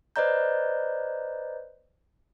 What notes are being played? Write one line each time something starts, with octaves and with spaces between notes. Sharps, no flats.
B4 C5 D5 D#5 A#5 G6